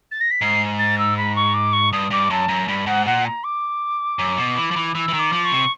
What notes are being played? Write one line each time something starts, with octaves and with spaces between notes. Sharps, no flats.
A6
A#6
B6
G#2 C7
A6
E6
B5
C#6
D6
C#6
G2 D#6
G2 D6
F#2 A5
F#2 A#5
G2 B5
G#2 F#5
A#2 F#5
A#5
D6
F#2
B2
E3
F3
E3
E3 E6
E3
D#3
D6
F3
C#6
C3